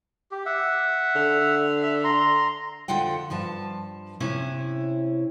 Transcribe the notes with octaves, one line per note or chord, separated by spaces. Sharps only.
G4
E5 F#5
D3
E5
A#5 C6
F2 D3 F4 F#5 G5
G2 F3 A5
C3 C#4 E4